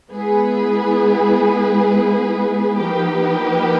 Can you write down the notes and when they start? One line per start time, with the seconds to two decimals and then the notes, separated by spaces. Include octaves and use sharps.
0.10 G#3 B3 E4 G#4 B4
2.77 F3 A#3 D#4 G4 B4